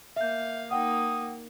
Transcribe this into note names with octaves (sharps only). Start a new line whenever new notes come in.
A#3 E5 F5 G6
A#3 D#4 F#5 G5 D#6